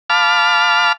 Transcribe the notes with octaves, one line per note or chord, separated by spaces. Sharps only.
F5 A5 B5 D6 F6